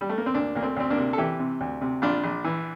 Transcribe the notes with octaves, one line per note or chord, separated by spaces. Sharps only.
G3
A3
A#3
C4
D2 A#3 D4
D2 A#3
A3 C4
D2 C4
A#3 D4
C3
A4
E3 E4 G4
C3
D2
C3
A#1 D4 F4
A#1
E3